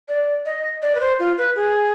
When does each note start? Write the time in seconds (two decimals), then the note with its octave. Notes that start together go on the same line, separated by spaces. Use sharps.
0.08 D5
0.46 D#5
0.82 D5
0.95 B4
1.00 C5
1.19 F4
1.38 B4
1.56 G#4